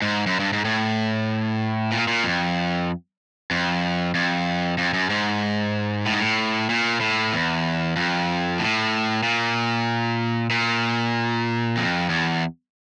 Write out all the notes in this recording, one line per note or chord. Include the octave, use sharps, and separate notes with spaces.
G#2
F#2
G2
G#2
A2
A#2
A#2
F2
F2
F2
F2
F#2
G#2
A2
G#2
A2
A#2
A2
E2
F2
A2
A#2
A#2
F2
E2